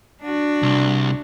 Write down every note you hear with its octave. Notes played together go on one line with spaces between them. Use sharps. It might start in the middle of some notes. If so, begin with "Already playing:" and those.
D4 F#4
C2